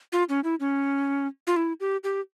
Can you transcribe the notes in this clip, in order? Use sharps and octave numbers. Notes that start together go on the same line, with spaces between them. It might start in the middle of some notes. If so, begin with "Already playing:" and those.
F4
C#4
E4
C#4
F4
E4
G4
G4